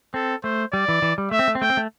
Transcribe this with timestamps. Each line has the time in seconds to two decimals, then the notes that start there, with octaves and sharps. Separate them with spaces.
0.14 C4 A4
0.44 A3 C5
0.73 G3 D5
0.88 E3
1.02 E3
1.18 G3
1.31 A3 E5
1.39 C4
1.48 A3
1.55 C4
1.61 A3 G5
1.70 C4
1.77 A3